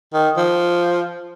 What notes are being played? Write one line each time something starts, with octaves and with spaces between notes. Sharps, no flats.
D#3
F3